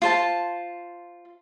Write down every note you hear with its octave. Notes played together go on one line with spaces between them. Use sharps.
F4 C5 A5